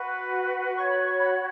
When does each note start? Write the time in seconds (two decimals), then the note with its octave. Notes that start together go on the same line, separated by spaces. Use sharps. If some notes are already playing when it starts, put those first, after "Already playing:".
Already playing: F#4 B4
0.76 F#4 C#5 C#6
0.91 B5
1.05 C#6
1.19 B5